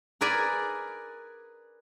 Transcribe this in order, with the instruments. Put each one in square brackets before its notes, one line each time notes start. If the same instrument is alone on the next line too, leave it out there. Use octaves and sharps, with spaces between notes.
[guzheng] G#4 A#4 B4 D5 G#5